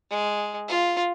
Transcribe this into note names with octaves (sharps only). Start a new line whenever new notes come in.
G#3
F4